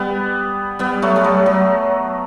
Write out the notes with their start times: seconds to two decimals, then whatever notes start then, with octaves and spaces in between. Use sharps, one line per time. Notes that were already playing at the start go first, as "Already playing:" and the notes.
Already playing: G3 B3
0.79 G3 B3
1.02 F#3 A3
1.16 G3
1.24 F#3 A3
1.46 F#3